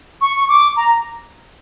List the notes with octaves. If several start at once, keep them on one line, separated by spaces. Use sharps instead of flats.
C#6
D6
A#5